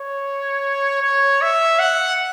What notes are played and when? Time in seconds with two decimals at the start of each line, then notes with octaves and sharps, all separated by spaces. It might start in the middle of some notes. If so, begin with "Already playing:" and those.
Already playing: C#5
1.02 C#5
1.42 E5
1.79 F#5